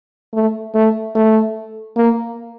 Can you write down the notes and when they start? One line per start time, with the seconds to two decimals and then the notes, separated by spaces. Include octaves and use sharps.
0.34 A3
0.75 A3
1.15 A3
1.97 A#3